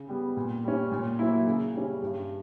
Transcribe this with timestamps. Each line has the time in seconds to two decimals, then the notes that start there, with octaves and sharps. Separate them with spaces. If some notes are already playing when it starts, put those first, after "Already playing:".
Already playing: C#3
0.09 G3 B3
0.37 A#2
0.64 G3 C#4
0.92 A#2
1.19 F#3 A#3 E4
1.47 C#3
1.74 G3 C#4
2.02 G2